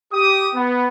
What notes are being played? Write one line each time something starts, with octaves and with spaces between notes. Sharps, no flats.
G4 D#6
B3